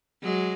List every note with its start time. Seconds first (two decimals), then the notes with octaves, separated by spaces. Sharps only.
0.22 F#3 G#3